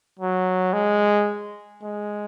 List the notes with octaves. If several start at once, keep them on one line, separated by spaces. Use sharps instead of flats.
F#3
G#3
G#3